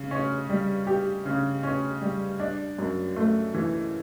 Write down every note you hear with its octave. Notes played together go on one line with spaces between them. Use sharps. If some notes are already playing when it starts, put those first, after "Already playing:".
Already playing: C#3
C#4
G3
G4
C#3
C#4
G3
D4
F#2
A3
E3